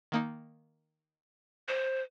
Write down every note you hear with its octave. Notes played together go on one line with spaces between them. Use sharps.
D#3 A#3 D#4
C5